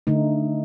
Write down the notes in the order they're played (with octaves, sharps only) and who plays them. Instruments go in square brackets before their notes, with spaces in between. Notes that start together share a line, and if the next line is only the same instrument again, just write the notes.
[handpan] D3 A3 D#4